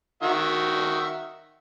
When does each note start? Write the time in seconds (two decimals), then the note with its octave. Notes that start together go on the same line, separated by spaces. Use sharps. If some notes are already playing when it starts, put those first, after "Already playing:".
0.23 D#3 F#4 E5